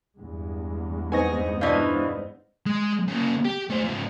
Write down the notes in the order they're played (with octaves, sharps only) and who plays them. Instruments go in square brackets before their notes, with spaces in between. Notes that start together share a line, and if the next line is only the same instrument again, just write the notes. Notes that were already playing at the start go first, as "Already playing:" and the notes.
[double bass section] E2 G2 G#3
[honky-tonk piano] B3 C4 D#4 [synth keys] G#5 C#6 A#6
[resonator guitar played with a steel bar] B2 E3 D#5 [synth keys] D4 C5 F5
[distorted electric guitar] G#3
C#3 A#3
G4
A3 C5
G#2 F3